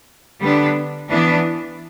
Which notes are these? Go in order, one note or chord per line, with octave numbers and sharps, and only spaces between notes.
D3 G3 B3 D4
E3 B3 D4